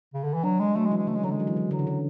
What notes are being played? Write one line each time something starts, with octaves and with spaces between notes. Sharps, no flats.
C#3
D3
E3
F#3 D4
G#3
F#3 A3
G#3
E3
G#3
C#3 A3
G#3
D3 F#3
G#3
F#3
E3
F#3
D3 F#3
C#3
D3